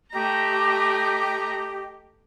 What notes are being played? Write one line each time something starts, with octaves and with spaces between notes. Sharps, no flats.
A3 G4 D#5 A#5